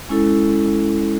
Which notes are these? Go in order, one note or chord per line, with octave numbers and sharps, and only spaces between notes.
G#3 C#4 E4 A4